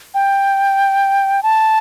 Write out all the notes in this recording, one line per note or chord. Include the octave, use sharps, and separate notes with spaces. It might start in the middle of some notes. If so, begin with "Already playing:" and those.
G5
A5